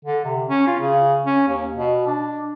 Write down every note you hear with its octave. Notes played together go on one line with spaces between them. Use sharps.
D3
C3
C#4
F4
C#3
C#4
D#2
B2
D4